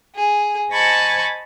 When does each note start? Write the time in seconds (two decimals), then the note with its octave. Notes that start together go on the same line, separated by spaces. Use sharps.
0.14 G#4
0.72 C5 D#5 G#5 A5 B5 C#6